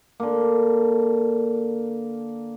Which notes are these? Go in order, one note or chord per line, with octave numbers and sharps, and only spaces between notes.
D3 A#3